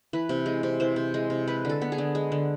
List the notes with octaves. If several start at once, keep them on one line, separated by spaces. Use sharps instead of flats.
E3 B4
C3
G#3
C3
E3 C5
C3
G#3
C3
G#3 B4
D3 A4
B3
G#4
D3
G#3
D3